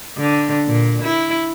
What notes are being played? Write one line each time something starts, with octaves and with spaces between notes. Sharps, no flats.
D3
A#2
E4